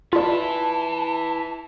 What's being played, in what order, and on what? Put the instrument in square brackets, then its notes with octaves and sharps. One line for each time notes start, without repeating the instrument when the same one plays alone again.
[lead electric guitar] E4 B4 [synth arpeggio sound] F4 D5 [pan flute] A5